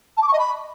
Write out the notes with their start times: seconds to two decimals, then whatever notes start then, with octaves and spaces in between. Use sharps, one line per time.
0.17 A5
0.22 D6
0.28 C#6
0.33 D#5
0.39 B5